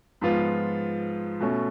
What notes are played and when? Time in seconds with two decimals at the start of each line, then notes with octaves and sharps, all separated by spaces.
0.21 G#2 F3 B3 F4
1.40 B2 A3 C#4